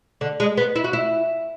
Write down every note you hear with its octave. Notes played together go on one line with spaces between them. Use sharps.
D3
G#3
B3
E4
F#4
E4